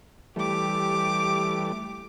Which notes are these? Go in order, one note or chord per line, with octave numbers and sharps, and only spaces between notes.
E3 G3 A3 G4 D6